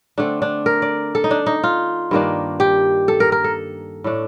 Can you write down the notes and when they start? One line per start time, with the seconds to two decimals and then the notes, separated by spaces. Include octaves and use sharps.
0.18 D3 A3 C4 D4
0.42 D4
0.66 A#4
0.82 D5
1.15 A4
1.24 D#4
1.31 D4
1.46 D#4
1.64 F4
2.11 G2 D#3 A#3 D4
2.60 G4
3.08 A4
3.20 A#4
3.32 A#4
3.44 A4
4.04 A2 A3 D4